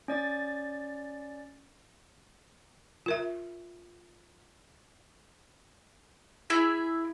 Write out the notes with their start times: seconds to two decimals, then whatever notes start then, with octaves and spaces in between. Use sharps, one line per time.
0.08 C#4 D5 A6
3.06 F4 A#4 E5
6.50 E4 G#4 E5